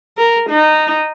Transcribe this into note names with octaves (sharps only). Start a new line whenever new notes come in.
A#4
D#4